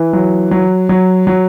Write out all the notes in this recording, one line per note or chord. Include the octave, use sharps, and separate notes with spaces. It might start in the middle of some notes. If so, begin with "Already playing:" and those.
Already playing: E3
F#3
F#3
F#3
F#3